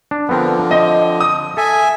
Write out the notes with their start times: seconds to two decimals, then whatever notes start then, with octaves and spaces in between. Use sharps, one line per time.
0.11 D4
0.29 D3 F3 B3 C4 A#4
0.71 C4 D#5
1.20 D#6
1.57 A4 E5 G#5